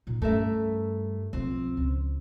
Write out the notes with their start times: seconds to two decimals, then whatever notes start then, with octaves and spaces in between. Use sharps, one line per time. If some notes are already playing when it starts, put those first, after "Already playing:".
0.07 A#2 D#4
0.22 G2 A3 C#4 A#4 E5
1.33 B1 F3 C4
1.77 C#2